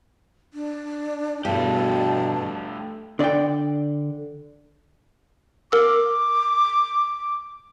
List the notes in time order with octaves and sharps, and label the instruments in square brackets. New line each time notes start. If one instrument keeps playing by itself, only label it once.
[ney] D4
[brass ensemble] E2 B2 [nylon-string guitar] G2 [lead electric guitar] A3 G4 [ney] A5
[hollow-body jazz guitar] D3 D5 D#5 F#5 G5
[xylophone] A#4 E6 [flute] D6